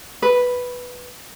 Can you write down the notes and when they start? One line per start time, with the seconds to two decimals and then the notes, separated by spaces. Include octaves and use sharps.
0.22 B4